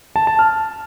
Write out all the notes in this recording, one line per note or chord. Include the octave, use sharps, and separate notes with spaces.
A5
A5
F6